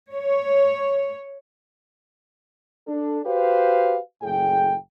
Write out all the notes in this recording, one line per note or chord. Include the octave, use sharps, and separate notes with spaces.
C#5
D4 A4
F#4 G4 B4 C5 F5
F#1 A2 G#4 G5